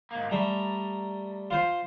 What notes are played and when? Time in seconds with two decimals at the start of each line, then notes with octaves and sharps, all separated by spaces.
0.11 G#2 A#3
0.31 G3 A3 A#5
1.51 F4 C5